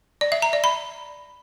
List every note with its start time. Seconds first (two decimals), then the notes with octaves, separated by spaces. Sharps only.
0.21 D5
0.32 E5
0.42 A#5
0.53 D5
0.64 B5